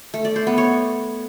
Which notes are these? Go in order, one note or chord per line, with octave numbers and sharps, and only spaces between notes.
A3
D5
C5
B3
C#5